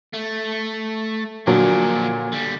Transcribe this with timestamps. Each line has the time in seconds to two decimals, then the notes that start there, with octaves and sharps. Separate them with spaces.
0.13 A3
1.47 A#2 D3 F3 F#3 D4
2.33 D3 G3